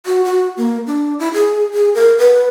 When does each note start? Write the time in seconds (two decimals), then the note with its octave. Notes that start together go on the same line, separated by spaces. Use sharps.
0.06 F#4
0.25 F#4
0.57 A#3
0.87 D4
1.19 E4
1.34 G#4
1.74 G#4
1.95 A#4
2.19 B4